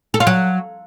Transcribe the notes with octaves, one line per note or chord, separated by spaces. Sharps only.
A4
F4
F#3